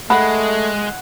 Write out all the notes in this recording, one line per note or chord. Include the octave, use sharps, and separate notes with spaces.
G#3 A3 F#5 B5